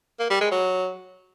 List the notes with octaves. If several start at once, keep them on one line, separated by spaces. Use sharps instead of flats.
A#3
G3
G#3
F#3